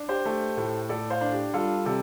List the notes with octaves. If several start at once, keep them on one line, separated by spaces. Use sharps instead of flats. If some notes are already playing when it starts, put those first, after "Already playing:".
Already playing: D4
G4 C5
A3
A2
A2 A4 D5
C5 F5
D4
G4
G3 F4 A4
C3 A4 D5